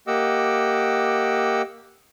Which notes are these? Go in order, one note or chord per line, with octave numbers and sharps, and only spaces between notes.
A#3 G4 D#5 F#5 D6 E6